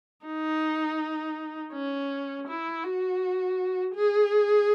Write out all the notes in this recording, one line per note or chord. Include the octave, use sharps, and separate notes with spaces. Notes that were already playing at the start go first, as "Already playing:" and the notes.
D#4
C#4
E4
F#4
G#4